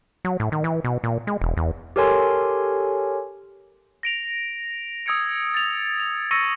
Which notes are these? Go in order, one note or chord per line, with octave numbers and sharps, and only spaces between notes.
F#3
A2
D#3
E3
B2
A#2
G#3
E1
E2
G4 A4 A#4 C#5 G#5 C6
A#6 D7 F7
D#6 E6 G#6 C#7 D7
A6 F7
F7
C#6 E6 A#6 C#7 D#7